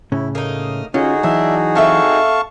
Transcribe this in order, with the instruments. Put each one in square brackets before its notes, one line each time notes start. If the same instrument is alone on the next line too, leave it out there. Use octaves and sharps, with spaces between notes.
[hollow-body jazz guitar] A2 C#3 C#4 [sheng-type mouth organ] E4
[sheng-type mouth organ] A3 D#6 F6 [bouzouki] A#3 D#4
[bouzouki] D3 [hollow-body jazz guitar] C#4 F4 [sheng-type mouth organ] D#4 F#4 G#4
[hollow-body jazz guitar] E3 F#3 [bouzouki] D4 [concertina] E5
[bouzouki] C4 A4 E5 [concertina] F5 A5 C#6